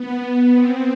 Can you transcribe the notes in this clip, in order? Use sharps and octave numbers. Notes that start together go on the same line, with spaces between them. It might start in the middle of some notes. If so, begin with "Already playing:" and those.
Already playing: B3
B3
C4